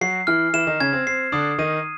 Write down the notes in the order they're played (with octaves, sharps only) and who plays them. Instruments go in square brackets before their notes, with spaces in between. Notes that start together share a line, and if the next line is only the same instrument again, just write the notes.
[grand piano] F#3 F#4 [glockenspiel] C7
[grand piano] E3 E4 [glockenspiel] F6
[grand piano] E3 E4 [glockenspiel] E7
[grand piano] D#3 D#4
[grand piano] C#3 C#4 [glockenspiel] G#6
[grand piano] C4
[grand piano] C4 [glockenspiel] C7
[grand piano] D3 D4 [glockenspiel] D#6
[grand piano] D#3 D#4 [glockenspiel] D#7